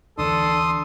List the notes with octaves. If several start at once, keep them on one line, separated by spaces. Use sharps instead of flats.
D2 D3 E3 D4 A4 C6 D#6